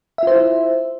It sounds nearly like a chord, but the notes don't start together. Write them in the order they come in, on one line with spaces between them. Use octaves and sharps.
E5 F4 C5 E4